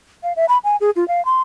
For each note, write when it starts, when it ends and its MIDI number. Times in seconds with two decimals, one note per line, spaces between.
0.23 0.33 77
0.36 0.46 76
0.49 0.58 83
0.64 0.76 80
0.81 0.90 68
0.96 1.07 65
1.08 1.24 77
1.25 1.42 84